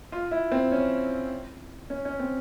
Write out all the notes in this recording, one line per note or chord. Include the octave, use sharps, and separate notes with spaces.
F4
E4
C4
C#4
C#4
C#4
C4